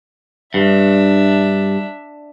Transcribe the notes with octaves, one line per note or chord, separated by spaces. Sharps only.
G2 D4 E5